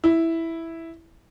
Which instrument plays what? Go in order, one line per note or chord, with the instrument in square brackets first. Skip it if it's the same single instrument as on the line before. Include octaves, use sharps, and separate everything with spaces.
[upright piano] E4